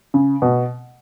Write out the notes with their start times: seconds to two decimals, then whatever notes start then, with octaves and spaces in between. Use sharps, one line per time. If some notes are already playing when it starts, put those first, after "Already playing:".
0.14 C#3
0.42 B2